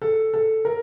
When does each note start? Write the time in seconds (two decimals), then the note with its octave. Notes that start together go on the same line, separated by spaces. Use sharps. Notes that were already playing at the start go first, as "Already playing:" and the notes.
0.02 A4
0.34 A4
0.65 A#4